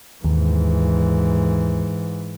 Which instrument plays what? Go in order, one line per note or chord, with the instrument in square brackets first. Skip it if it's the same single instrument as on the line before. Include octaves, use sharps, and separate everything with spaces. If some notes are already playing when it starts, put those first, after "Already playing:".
[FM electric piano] D#2 [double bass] G#2 E3